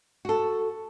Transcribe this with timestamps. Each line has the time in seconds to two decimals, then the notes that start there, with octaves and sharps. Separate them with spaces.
0.25 F#4 A4